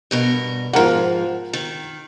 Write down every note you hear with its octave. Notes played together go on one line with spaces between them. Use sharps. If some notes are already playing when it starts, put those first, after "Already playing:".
G2 B2 A#4
G#2 F3 F4 A#4 F#5
D#3